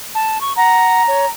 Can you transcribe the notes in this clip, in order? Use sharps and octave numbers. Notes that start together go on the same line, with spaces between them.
A5
C#6
F#5 A#5
C#5